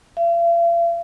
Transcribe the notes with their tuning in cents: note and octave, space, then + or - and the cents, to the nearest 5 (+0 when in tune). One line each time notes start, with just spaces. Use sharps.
F5 -45